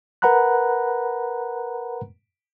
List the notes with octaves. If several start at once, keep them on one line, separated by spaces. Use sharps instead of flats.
A#4 B4 F#5 A#5 B5 F#6